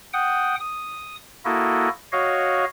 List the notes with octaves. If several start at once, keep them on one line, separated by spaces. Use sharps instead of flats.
F#5 G5 D#6
D#6
A#3 E4 F#4 A4 D#5
F#4 C#5 D#5 F5